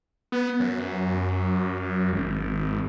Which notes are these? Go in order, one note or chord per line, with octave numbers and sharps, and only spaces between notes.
B3
F#2
G#1